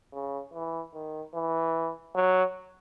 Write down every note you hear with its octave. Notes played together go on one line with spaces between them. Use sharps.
C#3
E3
D#3
E3
F#3